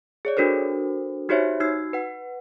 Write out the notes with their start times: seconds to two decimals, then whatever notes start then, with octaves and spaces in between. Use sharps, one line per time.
0.25 G#4 C#5 D5
0.37 D4 F#4 A4 A#4 C5
1.29 D#4 F#4 G4 C5 C#5 E5
1.60 D#4 F#4 E6 G#6 C7
1.93 B4 F#5